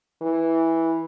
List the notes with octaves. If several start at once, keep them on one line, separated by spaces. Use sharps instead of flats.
E3